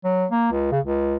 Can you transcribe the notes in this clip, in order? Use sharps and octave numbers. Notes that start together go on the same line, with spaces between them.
F#3
A#3
C#2
C#3
C#2